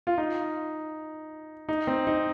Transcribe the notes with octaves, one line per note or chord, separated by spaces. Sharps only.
F4
D#4
D#4
C4
D#4